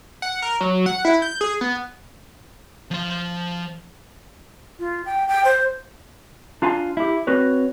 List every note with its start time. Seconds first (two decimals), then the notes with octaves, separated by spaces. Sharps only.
0.22 F#5
0.42 A#4
0.61 F#3
0.86 F#5
1.05 E4
1.22 G6
1.41 G#4
1.61 B3
2.91 F3 C6
4.79 F4
5.06 G5
5.28 G5
5.45 C5
6.62 D4 F4 F5 G#5 A5 C6
6.97 E4 G4
7.27 C4 F#4 B4 C#5